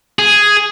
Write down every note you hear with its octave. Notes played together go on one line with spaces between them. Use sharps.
G#4